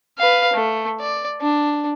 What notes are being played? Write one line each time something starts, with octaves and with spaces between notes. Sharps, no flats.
B4 F5
A3
D5
D4